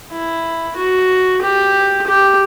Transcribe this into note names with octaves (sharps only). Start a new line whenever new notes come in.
E4
F#4
G4
G4